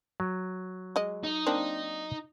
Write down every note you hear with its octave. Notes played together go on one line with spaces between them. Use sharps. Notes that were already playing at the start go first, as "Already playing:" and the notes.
F#3
G#3 D#5
D#4
A#3 C4 D4